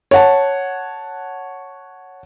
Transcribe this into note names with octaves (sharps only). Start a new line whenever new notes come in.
C#5 F#5 A5